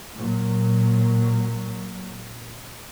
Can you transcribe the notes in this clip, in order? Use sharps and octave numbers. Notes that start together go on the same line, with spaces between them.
A#2 F#3